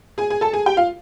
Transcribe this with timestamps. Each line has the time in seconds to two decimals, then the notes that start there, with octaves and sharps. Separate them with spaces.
0.18 G#4 G#5
0.30 G#4 G#5
0.41 A4 A5
0.53 G#4 G#5
0.66 G4 G5
0.77 F4 F5